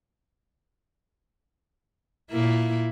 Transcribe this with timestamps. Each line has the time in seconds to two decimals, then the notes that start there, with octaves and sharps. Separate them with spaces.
2.31 A#2 A#3 E4